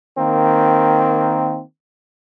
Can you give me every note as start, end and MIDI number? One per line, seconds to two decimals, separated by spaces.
0.18 1.63 51
0.18 1.63 58
0.18 1.63 60